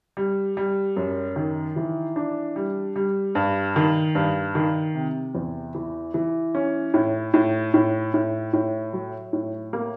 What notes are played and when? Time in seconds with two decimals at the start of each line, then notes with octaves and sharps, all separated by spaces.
0.17 G3
0.57 G3
0.97 F#2
1.36 D#3
1.76 E3
2.16 D4
2.56 G3
2.96 G3
3.35 G2
3.76 D#3
4.15 G2
4.55 D#3
4.94 C3
5.35 E2
5.75 E3
6.14 E3
6.55 C#4
6.94 A2
7.34 A2
7.74 A2
8.14 A2
8.53 A2
8.93 F#3
9.33 A2
9.73 A#3